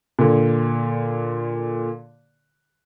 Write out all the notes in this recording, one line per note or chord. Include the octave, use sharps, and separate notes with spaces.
A#2 D3